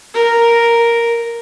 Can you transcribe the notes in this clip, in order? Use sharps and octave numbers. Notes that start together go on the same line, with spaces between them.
A#4